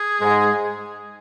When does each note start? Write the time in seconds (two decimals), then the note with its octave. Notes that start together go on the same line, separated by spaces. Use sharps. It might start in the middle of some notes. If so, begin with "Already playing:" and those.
Already playing: G#4
0.20 G#2 G#3